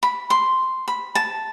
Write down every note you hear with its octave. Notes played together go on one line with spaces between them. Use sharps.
B5
C6
B5
A5